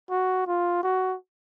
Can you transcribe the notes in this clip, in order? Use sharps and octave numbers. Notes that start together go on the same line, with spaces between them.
F#4
F4
F#4